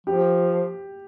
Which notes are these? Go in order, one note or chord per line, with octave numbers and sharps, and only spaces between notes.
F3 G4